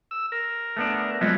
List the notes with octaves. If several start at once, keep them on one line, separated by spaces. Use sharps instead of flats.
E6
A#4
A3 B3 D4
F3 F#3 G#3 B3 E5